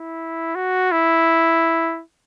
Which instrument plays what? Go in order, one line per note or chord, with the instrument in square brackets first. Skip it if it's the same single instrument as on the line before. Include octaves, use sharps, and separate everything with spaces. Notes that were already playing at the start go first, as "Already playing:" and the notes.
Already playing: [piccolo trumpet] E4
F#4
E4